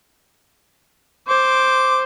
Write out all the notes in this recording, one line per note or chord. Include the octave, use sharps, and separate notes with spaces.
C5 D6